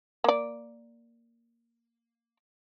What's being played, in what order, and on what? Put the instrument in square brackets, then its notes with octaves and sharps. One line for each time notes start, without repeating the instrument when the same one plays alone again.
[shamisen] A#3 D5